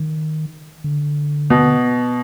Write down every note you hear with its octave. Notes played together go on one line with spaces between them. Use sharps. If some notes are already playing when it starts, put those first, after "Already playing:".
Already playing: D#3
D3
B2